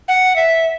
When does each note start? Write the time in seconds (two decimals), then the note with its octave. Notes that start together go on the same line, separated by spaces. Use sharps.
0.08 F#5
0.36 E5